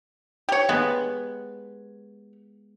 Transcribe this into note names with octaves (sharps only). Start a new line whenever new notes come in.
G4 C#5
G#3 B3